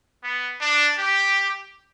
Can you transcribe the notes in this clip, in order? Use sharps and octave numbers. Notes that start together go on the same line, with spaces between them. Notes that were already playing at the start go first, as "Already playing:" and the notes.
B3
D4
G4